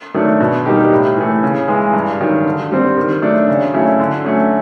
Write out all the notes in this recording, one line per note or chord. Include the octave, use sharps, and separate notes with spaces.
D#3 F#3 A3 D4
B2
G3 A#3 D#4 G4
A2
E3 A3
C#3
E3 G#3
G2
D#3 F#3
D3
G3 C4
D#3
F#3 A3 D4
C#3
F#3 A3 C#4 E4
D3
F#3 A3 C#4